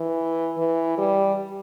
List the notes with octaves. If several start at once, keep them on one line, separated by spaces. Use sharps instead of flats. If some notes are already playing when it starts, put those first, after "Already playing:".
Already playing: E3
E3
G3